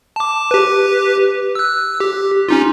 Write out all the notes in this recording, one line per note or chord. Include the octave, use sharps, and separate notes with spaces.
A5 D6
G4 B4
E6 F#6
G4
C#4 D#4 F4